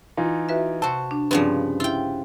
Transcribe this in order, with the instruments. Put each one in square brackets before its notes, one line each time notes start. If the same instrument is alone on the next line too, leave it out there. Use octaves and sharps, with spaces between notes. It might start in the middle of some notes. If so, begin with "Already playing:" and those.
[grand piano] E3 D#4 F4
[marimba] F#4 B4 E5
[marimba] C3 [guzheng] F#4 C5 [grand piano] A5
[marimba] D4
[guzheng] G2 C#3 F3 [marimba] C4 D5 F#5 [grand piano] B4
[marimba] E4 E5 [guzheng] F4 G5